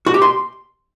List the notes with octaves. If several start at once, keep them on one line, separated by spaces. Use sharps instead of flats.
F#4
G4
C6